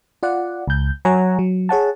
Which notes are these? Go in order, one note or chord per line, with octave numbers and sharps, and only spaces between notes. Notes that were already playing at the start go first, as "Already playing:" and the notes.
F4 D5 F#5
C#2 G6
F#3 C#5 F#5 G#5 A#5
F#3
G#4 C#5 F#5 A5